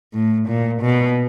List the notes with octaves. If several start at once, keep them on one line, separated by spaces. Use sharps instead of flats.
A2
A#2
B2